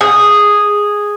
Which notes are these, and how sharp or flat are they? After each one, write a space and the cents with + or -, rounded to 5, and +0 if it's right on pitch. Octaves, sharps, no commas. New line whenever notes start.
G#4 -5